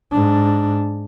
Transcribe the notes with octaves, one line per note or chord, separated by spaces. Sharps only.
G#2 D4